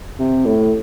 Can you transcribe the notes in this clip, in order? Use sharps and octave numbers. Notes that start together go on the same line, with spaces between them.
C3
A2